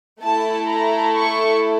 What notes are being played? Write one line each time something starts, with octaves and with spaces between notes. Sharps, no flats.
A3 E4 A4 A5
A#5
C#6